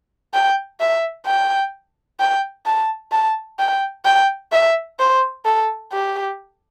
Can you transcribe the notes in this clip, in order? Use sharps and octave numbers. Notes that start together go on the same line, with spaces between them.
G5
E5
G5
G5
A5
A5
G5
G5
E5
C5
A4
G4